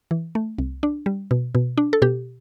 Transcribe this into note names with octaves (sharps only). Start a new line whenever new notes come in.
E3
A3
C2
D4
G3
B2
B2
D4
A4
B2 G4